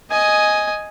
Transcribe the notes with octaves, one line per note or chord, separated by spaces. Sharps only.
D#5 G#5